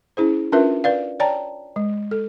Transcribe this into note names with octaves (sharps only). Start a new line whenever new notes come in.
C#4 E4 G#4 C5
C#4 D4 F4 A#4 B4 E5
B4 D5 F5
C#5 D5 G5 A5 A#5
G#3
A4